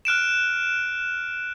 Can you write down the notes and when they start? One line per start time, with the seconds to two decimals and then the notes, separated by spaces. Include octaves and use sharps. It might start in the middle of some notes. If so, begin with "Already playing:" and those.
0.05 F6 F#6 D7 E7